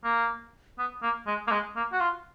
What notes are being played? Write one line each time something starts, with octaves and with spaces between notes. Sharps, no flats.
A#3
B3
A#3
G#3
A#3
G#3
A#3
F#4
F4